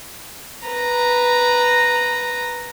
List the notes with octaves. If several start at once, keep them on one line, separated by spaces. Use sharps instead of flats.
B4 A#5